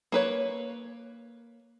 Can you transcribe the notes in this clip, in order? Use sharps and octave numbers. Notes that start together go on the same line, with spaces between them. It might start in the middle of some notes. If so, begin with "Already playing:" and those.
A#3 B4 C#5